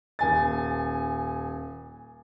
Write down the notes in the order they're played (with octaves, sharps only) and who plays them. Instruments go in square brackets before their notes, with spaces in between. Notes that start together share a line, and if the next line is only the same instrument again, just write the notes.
[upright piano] D#1 G#5 A6